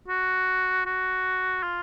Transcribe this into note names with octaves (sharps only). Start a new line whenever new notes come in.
F#4
F#4
F4